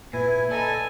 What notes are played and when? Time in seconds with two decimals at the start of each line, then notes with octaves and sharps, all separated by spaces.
0.13 A#2 E4 B4 G#5
0.51 A4 D5 D#5 G#5 A#5